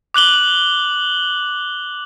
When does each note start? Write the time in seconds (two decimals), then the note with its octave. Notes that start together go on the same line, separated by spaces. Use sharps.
0.14 D6 F#6 F#7 G7